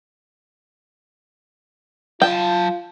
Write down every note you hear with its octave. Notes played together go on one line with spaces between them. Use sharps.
F#3 F4 G5 A5